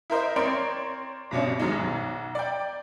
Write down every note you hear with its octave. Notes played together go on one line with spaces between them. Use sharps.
E4 A#4 C5 D#5
C4 A#4 C#5 D5 C6 D7
G2 B2 C#4 D4
G#1 F#2 F#3 G#3 D#4
B1
D5 G5